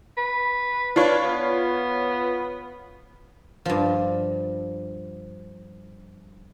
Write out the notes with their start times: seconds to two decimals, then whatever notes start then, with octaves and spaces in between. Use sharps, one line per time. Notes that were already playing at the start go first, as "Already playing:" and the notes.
0.17 B4
0.96 D4 F4 B4 C#5
1.25 B3
3.65 G2 F3